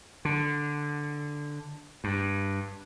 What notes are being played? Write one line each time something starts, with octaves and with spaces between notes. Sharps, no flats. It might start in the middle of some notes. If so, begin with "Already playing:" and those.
D3
G2